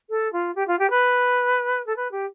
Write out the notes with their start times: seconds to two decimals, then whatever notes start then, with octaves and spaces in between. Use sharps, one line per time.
0.10 A4
0.33 F4
0.55 G4
0.68 F4
0.79 G4
0.90 B4
1.87 A4
1.96 B4
2.12 G4